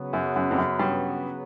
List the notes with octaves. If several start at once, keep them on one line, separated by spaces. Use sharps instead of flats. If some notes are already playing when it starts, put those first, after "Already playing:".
Already playing: C#3 F#3 B3
F#2
F#2
F2
F#2
G2